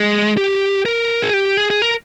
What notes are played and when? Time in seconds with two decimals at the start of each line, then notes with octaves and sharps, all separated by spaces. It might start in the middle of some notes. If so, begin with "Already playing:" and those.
Already playing: G#3
0.37 G4
0.86 A#4
1.22 G#4
1.34 G4
1.57 G#4
1.70 G#4
1.82 A#4